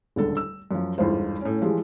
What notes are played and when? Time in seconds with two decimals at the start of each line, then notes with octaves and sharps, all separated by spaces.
0.16 D#1 C#2 D3 A4
0.37 E6
0.71 F#2 F3
0.98 G1 E2 G#2 F4 C5
1.41 A2 C#4
1.61 E3 F3 G3 G#3